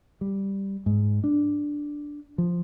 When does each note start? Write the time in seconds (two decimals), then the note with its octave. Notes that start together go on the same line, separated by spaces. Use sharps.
0.21 G3
0.86 G#2
1.24 D4
2.38 F3